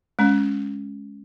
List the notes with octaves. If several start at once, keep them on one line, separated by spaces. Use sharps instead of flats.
G#3 C#4